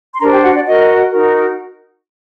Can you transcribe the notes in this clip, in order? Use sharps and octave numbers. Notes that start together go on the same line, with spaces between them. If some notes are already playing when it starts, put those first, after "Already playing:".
C6
D4 G4 A#4 C5 A#5
G4 G5
F#4 F#5
D5
F#4 A#4 D#5
D#4 F#4 A#4